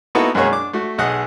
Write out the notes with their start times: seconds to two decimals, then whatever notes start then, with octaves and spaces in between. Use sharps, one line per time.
0.15 A#3 B3 D#4 E4 F#4 A4
0.35 F#2 B2 G#3 A#3 G#4 C#5
0.51 D4 D6
0.73 A3 F#4
0.98 B1 G#4 D#5 F#5 D#6 F#6